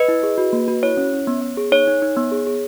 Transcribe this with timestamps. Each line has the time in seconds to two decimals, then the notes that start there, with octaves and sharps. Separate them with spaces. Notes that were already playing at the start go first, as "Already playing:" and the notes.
Already playing: B4 D#5
0.08 E4
0.23 G#4
0.38 F#4
0.53 A#3
0.68 F#4
0.83 E4 C#5
0.97 C#4
1.13 C#4
1.27 B3
1.42 B3
1.57 G#4
1.72 D#4 C#5
1.87 D#4
2.02 D#4
2.16 B3
2.32 G#4
2.47 G#4